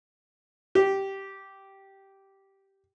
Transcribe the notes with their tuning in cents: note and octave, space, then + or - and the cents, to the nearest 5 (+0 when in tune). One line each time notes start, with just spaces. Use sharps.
G4 -10